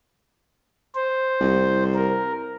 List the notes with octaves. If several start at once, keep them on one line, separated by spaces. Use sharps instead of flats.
C5
C2
A#4